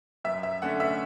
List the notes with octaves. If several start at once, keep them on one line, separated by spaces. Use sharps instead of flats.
F#2 E5
E5
D3 A3 C#4 F#5
E5